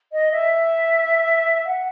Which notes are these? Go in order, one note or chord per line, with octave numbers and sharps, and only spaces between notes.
D#5
E5
F#5